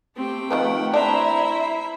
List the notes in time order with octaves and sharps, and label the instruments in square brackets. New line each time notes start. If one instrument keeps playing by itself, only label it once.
[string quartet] A3 G5 [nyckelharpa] C4 G4
[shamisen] D#3 F3 B4 [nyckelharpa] F#5
[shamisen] D4 [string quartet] E4 E5 [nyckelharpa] C5 A#5